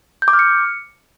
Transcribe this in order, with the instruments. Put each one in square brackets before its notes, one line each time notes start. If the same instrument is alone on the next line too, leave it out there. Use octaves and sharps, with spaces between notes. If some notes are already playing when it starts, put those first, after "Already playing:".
[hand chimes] G6
D6
F6
C#7